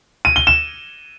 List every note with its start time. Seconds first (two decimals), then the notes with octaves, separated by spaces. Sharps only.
0.25 D#7
0.36 G7
0.47 E7